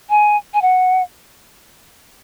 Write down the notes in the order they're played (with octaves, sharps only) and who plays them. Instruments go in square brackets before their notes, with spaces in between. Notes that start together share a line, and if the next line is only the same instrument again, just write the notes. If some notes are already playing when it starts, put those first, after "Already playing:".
[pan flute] G#5
G#5
F#5